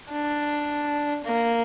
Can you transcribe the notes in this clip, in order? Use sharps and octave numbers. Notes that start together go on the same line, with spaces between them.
D4
A#3